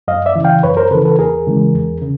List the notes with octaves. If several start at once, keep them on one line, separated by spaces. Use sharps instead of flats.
F#2 D#5 F5
D5 E5
C#3 E3
F5 G5
F#2 B4 C#5
A#4 C5
C#3 E3 A4 B4
A4 B4
E2 G#4 A#4
C#3 E3 G#3
E2
C#3